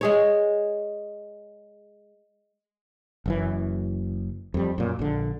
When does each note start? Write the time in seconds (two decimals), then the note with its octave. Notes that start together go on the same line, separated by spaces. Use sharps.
0.01 G#3 G#4 C#5
3.26 F#1 F#2 E3
4.54 F2 G3
4.78 F#2 A#2
4.99 A#1 D3